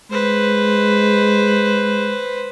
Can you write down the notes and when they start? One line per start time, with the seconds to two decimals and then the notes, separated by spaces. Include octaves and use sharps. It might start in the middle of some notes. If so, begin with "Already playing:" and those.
0.11 G#3 B4 C5